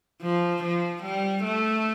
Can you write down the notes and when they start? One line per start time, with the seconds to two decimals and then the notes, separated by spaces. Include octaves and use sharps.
0.22 F3
0.63 F3
1.03 G3
1.44 A3